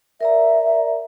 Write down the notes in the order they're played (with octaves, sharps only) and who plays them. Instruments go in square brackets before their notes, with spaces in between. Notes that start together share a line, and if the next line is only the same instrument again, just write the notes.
[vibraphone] A#4 D5 A#5 [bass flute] E5